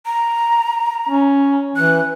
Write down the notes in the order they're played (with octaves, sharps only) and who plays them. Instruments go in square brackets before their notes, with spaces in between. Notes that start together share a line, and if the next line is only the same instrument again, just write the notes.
[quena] A#5
[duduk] C#4
[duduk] E3 [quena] F#6